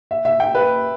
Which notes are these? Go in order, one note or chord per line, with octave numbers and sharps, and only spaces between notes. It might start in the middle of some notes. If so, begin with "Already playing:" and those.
E5
E5
G5
B4